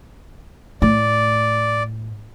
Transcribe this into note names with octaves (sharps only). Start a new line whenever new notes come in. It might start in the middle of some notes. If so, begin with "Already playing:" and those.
A2 D5